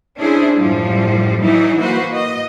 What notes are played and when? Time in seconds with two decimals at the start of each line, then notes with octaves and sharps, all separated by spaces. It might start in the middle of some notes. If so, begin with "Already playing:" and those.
0.17 C#4 D4 E4 G#4 C5
0.55 F#2 A2 F3 G3
1.41 E3 F#3 G3 D#4 E4
1.80 A#3 F#4 B4 C5
2.12 D#5